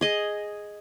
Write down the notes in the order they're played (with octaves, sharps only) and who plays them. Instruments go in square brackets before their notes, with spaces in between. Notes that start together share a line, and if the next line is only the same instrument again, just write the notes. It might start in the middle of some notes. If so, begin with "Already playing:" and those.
[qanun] G#4 D#5